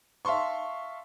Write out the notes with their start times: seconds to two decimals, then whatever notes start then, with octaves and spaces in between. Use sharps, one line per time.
0.25 E5 F5 A5 C6 C#6